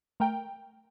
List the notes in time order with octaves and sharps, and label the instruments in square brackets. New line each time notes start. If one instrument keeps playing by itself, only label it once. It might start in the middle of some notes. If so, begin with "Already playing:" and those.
[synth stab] A3 A#4 G5